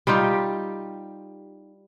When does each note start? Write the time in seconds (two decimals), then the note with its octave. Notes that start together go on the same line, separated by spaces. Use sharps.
0.07 G3 D#4 F4 G4